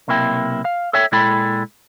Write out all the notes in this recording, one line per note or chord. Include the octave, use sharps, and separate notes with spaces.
B1 C3 A#3 E4 G5
F5
A4 C#5 E5 G5
A#2 G#3 E4 A4 G5 B5